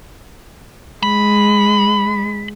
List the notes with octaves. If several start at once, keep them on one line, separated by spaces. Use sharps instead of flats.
G#3 B5